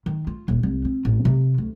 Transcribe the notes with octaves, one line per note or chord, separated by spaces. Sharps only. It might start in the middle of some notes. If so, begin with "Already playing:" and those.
D#3
F4
D#1
C2
C4
A1
C3
D2